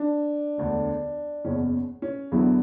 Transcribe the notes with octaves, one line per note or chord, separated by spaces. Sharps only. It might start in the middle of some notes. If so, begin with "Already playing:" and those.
Already playing: D4
E1 D2 D3
F#1 E2 B2 C#4
C#4
E2 D3 F#3 B3 E4